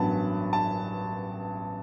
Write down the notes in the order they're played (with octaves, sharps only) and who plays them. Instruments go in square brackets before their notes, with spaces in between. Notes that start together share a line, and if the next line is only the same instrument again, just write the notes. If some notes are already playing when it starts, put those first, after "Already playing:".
Already playing: [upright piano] A1 G2 F#3 B3 A5 B5
A5